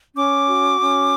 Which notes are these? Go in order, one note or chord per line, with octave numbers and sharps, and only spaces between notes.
C#4 D6
F#4
C#4